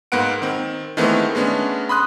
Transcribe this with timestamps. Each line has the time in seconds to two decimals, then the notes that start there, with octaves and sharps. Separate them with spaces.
0.12 G#2 A#3 B3 B4 F#5 D7
0.42 D#3 C4
0.97 D#3 E3 G#3 A3 B3 C4
1.35 G#3 A3 B3 C#4 D4
1.89 B5 C6 D#6 F#6